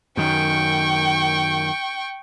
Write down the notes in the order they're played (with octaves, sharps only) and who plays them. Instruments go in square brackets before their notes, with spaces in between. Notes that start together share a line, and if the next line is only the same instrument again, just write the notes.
[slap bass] F#2 D#3 [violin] G5 C#6